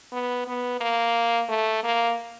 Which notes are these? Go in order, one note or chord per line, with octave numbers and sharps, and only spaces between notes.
B3
B3
A#3
A3
A#3